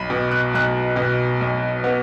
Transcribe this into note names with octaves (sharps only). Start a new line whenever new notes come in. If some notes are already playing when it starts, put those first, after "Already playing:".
Already playing: B1 B5
B2
F#6
B1 F#6
B2
B1
B3